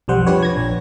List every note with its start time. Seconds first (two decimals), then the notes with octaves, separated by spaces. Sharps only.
0.08 B1 F2 G3 C5 F#5
0.27 F3 D4 G4 B4 C#5
0.43 G#6 A#6
0.56 A#1